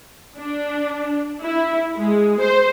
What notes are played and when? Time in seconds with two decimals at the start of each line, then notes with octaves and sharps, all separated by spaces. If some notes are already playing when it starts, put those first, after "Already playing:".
0.37 D4
1.41 E4
1.96 G#3
2.39 C5